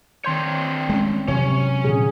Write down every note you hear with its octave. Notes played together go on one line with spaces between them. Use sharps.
D#3 C4 D4 C#5 C6 G6
G#3 C#4
C3 F#3 C#4 C#5
A#2 D3 G#4